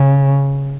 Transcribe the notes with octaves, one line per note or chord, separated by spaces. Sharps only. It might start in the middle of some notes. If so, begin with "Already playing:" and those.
Already playing: C#3